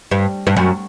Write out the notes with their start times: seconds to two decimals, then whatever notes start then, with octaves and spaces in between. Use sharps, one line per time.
0.11 G2
0.47 G2
0.57 F#2